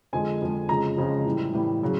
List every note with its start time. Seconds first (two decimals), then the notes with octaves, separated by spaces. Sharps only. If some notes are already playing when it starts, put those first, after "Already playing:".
0.13 F2 D3 F3 G#3 G#5
0.41 F2 D3 F3 G#3
0.69 F2 C#3 F3 G#3 A#5
0.97 F2 C#3 F3 G#3
1.25 A2 E3 G3
1.54 A2 E3 G3
1.83 C#3 F#3